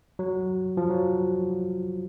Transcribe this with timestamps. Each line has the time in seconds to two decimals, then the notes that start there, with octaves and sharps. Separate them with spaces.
0.19 F#3
0.77 F3
0.90 F#3